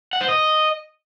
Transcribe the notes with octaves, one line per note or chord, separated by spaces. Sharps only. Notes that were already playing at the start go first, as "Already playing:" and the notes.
F#5
C5
D#5